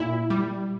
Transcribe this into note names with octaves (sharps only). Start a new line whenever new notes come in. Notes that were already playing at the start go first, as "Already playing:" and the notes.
Already playing: A#2 E4
G3